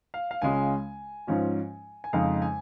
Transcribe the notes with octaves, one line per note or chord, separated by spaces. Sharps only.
F5
F5
C#2 C#3 G#3 C#4 F4 G#5
G#2 F3 C#4 F4
G#5
F2 C#3 G#3 D#4 F5
G#5